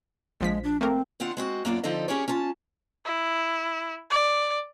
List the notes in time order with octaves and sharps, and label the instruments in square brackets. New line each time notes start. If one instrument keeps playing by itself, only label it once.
[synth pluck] A#1 F3 B6 [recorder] G#3
[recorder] D4
[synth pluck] A3 A#3 A#4 [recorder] C4
[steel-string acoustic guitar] D#3 C4 D4 F4 F#5
G#3 C4 F#4
F#2 A#3 B3 D4 F4 D5
D3 F3 C4 D#4 A4 D#5
C#4 G4 G#4 A#4 C#5
C#4 F4 A5
[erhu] E4
D5